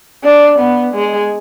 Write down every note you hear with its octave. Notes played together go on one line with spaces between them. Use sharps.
D4
B3
G#3